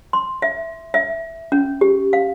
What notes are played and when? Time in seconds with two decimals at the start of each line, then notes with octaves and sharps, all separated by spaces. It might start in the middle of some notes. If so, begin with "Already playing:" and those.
0.13 C6
0.42 E5
0.94 E5
1.52 C#4
1.81 G4
2.13 F5